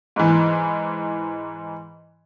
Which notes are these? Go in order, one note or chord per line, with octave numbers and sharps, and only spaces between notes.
G#2 E3